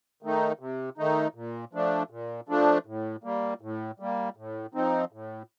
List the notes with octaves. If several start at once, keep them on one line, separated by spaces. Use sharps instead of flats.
D#3 A3 D#4
C3
D#3 A3 D#4
A#2
F3 A3 D4
A#2
F3 A3 D4
A2
G3 A#3
A2
G3 A#3
A2
F3 C4 D#4
A2